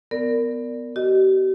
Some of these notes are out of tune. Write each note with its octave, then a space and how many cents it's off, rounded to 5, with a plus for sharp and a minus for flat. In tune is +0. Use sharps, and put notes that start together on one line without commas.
B3 +15 A#4 -15 D5 +0
G4 -45 D#5 +0